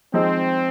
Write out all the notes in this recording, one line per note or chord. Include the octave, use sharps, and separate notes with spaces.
F3 G#3 C4 D#4